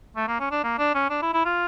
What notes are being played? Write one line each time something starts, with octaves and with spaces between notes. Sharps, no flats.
A3
A#3
C#4
D4
A#3
D4
C#4
D4
E4
E4
F4